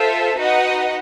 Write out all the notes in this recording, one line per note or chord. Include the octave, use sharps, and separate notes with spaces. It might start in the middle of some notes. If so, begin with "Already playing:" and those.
Already playing: F4 A4 C5 E5
D#4 F#4 B4 D#5 F#5